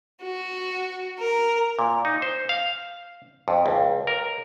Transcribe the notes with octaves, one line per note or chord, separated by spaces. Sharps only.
F#4
A#4
A#2
D#4
C5
F5
F2
C#2
A#4